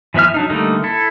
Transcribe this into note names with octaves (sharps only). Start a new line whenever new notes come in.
E3 F3 B3 E5 F6
F#3 D4 D#4
D3 G3 A3 A#3 D#4
E4 A4